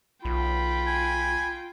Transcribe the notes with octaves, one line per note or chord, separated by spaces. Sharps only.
B1 F4 G5 B5
G#5